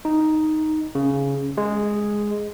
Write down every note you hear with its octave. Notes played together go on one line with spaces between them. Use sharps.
D#4
C#3
G#3